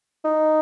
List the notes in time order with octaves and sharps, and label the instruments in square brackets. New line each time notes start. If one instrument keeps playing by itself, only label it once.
[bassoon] D#4